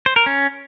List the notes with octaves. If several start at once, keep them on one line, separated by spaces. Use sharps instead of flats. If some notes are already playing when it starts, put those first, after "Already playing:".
C5
A#4
C#4